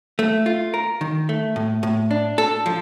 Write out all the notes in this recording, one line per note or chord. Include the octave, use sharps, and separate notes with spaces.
A3
F4
A#4
D#3
A3
A2
A2
D4
A4
F3